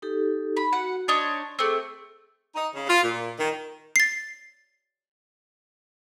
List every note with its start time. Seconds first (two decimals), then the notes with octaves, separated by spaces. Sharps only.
0.02 D#4 G4 A4
0.57 B5
0.73 F#4 F#5
1.08 D4 D#4 C#5 C6
1.59 A3 C4 G#4 A4 D6
2.55 D#4
2.74 C#3
2.88 F4
3.03 A#2
3.39 D#3
3.96 A6 C7